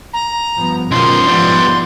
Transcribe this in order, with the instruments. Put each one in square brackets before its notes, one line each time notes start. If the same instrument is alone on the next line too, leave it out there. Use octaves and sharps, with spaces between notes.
[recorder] A#5
[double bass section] G2 F3 B3
[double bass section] F#1 B2 D#3 [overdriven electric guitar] C#2 F3 [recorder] C6
[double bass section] G#2 F3 B3 [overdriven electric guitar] E3 G3